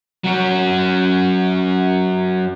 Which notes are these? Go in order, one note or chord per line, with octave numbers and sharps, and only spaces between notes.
F#3 C#4